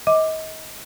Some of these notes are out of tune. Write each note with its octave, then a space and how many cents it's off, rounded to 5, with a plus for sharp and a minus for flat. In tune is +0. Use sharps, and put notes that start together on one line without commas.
D#5 +30 D6 +10